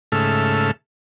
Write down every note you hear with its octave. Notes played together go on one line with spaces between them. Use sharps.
G#2 C#3 A3 A4 E5 F6